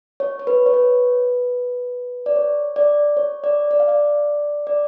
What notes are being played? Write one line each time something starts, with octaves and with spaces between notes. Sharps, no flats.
C#5
C#5
B4
C#5
B4
D5
C#5
D5
C#5
D5
D5
F5
D5
D5